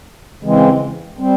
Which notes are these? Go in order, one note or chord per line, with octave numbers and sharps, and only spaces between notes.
C#3 E3 G#3 C4
G3 C4